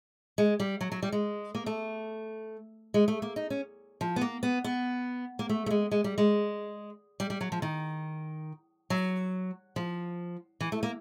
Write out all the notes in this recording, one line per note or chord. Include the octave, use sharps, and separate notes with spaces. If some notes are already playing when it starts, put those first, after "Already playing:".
G#3
G3
F#3
F#3
G3
G#3
A#3
A3
G#3
A3
A#3
D#4
C#4
F3
B3
A#3
B3
B3
A#3
A3
A3
G#3
G#3
G3
G#3
G3
G3
F#3
F3
D#3
F#3
F3
E3
A3
A#3